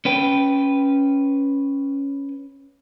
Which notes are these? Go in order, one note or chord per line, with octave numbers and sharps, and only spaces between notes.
C#4 B4 G5